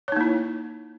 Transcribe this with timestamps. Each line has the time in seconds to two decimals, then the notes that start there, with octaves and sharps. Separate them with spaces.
0.08 C#5
0.12 D#4
0.16 A#3
0.21 E4